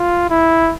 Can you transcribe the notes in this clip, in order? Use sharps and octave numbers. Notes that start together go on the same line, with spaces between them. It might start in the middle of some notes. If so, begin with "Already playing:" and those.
Already playing: F4
E4